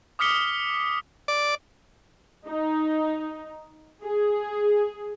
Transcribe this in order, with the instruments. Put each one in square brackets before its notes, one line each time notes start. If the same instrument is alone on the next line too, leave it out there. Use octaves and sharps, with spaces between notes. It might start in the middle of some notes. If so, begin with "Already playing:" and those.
[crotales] D6 D#6 F6 B6 C#7 G7
[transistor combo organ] D5
[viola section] D#4
G#4